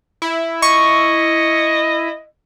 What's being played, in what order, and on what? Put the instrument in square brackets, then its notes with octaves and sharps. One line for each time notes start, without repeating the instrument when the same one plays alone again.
[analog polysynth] E4
[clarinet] D#5 [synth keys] C#6